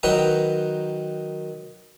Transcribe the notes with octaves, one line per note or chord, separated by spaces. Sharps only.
D#3 F#3 B4 G5 A#5